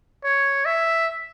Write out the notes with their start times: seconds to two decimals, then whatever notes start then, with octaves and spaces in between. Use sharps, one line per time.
0.24 C#5
0.65 E5